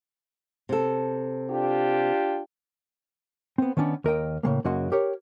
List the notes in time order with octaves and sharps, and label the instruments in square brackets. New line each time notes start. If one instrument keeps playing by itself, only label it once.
[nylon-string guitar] C3 A4
[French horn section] D4 F4 G4
[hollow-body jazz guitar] B3 C4
D#3 B3 C#4 D4
D#2 A#4 D#5 G5
A2 C#3 G#3 A#3
F#2 C#3 A#3 F#4 D#5 C6
G4 A#4 C#5